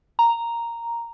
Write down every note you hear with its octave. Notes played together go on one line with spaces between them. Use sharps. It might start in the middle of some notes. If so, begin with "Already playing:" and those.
A#5